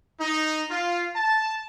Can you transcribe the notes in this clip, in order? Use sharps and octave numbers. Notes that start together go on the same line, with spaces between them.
D#4
F4
A5